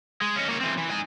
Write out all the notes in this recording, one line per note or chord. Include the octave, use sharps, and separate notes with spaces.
G#3
C#4 D#4
A#3 C#5
E3 C4
E3
D#4 G#5